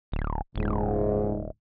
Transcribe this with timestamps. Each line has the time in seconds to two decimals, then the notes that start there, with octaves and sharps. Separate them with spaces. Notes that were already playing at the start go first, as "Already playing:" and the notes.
0.12 D1
0.56 D#1 C#2 G#2